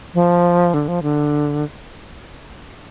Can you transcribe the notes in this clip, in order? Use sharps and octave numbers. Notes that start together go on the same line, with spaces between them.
F3
D3
F3
D3